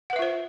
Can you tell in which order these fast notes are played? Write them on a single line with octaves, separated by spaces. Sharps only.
F#5 B4 E5 F4 C5